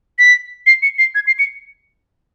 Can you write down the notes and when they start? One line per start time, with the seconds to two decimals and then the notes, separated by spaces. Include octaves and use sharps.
0.19 B6
0.67 C7
0.82 C#7
0.98 C7
1.15 G#6
1.27 C7
1.39 C#7